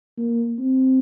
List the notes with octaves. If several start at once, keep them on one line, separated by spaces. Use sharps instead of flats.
A#3
C4